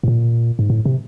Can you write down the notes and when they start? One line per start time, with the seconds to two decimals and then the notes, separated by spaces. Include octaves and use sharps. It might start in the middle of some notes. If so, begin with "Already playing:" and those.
0.03 A2
0.08 A#2
0.59 G#2
0.70 A2
0.85 C3